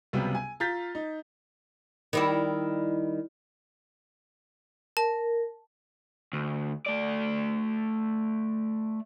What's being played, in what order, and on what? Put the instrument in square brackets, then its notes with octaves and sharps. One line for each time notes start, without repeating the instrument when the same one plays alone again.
[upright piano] C#2 C3 F#3 G3 B3
G#5
F4 A#5 G6 A6 B6
D#4
[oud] D#3 G3 E4
[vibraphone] A#4 [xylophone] A5
[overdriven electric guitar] D2
A3 D5